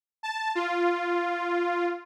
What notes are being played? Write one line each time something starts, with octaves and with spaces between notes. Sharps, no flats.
A5
F4